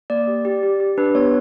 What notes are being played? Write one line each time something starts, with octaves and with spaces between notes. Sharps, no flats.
A#3 D5
G4
G4
G4
G4
D4 B4
B3 C#5